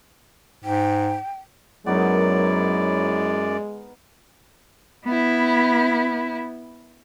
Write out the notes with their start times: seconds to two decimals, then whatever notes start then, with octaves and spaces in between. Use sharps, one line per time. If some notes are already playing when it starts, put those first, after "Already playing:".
0.64 G#2 G5
1.86 F#2 F#3 G#3 B3 D#4 E4 A#4 D5
5.05 B3 E4